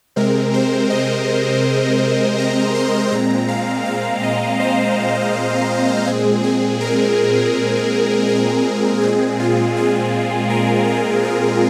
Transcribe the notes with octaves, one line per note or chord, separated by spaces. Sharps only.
C3 G#3 C4 A#4
C5
D#5
A#5
C6
A#2 G#3 C4 A#5
F5
F5
D#5
C5
A#2 G#3 C4 G#4
G#4
A#4
A#4
A#2 G#3 C4 G#4
F4
G#4
A#4
F4
G#4